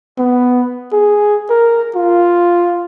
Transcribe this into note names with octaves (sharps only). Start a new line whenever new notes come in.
B3
G#4
A#4
F4